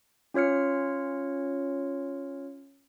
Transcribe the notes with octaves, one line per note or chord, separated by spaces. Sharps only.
C#4 F4 C#5 F6 C#7